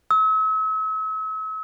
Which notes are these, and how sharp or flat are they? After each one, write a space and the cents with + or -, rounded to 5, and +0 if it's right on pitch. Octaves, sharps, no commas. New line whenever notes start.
E6 -40